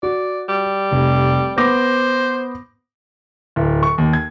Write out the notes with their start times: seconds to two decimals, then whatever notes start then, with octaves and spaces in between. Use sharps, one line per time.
0.03 F#4 D5
0.49 G3
0.92 F1
1.58 B3 C5 D6 A#6
3.56 D1
3.83 C#6
3.98 D#2
4.13 G#6